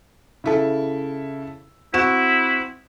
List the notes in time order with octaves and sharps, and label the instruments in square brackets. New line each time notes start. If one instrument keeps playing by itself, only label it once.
[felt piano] C#3 E4 A4
[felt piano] C4 F#4 E7 [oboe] E4